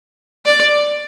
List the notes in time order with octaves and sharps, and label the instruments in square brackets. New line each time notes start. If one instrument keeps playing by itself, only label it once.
[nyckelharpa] D5